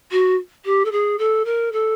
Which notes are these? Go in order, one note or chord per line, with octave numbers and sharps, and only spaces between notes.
F#4
G4
A4
G#4
A4
A#4
A4